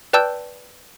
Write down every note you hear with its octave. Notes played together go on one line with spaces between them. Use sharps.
B4 D5 G5 A5 E6 G6